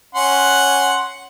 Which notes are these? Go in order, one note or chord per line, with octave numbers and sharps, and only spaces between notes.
C#4 F#5 C6